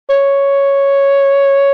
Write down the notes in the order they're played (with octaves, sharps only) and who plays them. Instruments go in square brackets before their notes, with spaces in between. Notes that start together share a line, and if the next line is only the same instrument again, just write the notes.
[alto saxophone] C#5